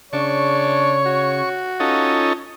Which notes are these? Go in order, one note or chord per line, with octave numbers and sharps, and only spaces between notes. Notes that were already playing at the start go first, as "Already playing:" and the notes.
C#3 D4 C#5 C#6
F#4
C#4 D#4 F4 A4